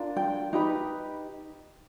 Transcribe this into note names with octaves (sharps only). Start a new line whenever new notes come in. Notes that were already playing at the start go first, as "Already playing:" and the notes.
Already playing: D4 F4 A#4
G5
D#4 G4 B4